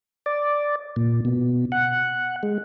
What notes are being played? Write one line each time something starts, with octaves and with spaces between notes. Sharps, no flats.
D5
A#2
B2
F#5
G#3